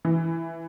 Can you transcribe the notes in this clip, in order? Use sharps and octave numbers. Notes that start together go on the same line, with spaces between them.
E3